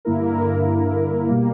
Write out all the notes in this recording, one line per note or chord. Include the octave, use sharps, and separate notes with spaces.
G2 D3 A#3 E4 A#4
B2 G3 A#3